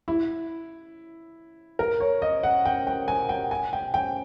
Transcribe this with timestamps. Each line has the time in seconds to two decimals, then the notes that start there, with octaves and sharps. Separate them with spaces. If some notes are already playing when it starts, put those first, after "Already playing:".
0.08 E4
1.79 A#4
2.00 C#5
2.22 D#5
2.43 F#5
2.66 G5
2.87 G5
3.08 G#5
3.29 G5
3.51 G#5
3.73 G5
3.94 G5